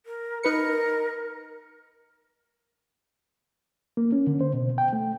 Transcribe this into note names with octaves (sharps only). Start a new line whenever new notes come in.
A#4
D#4 A#4 B4 C#7
A#3
C#4
D3
C5
B2
G5
A3